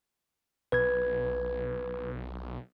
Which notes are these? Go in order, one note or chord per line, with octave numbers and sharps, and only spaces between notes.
B1 B4 G#6